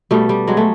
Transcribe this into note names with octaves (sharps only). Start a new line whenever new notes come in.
B2 G3 A3
G3
F#3 G#3
A3